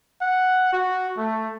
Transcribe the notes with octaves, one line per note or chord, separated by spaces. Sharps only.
F#5
F#4
A3